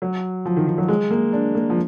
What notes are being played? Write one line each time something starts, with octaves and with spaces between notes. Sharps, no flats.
F#3
F3
D#3
D#3
F#3
G#3
A#3
D4
A#3
F3